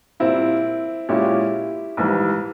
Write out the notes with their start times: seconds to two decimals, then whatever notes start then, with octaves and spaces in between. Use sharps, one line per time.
0.20 A#2 G3 A#3 C4 E4 F4
1.09 A#2 G#3 C#4 E4 F4 G4
1.97 A#1 G#2 E3 G3